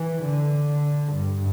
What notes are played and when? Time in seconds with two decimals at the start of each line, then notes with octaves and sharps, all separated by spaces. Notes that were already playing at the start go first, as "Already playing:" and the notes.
Already playing: E3
0.25 D3
1.13 G2